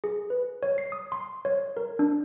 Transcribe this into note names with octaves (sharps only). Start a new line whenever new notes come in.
G#4
B4
C#5
C7
D#6
C6
C#5
A#4
D4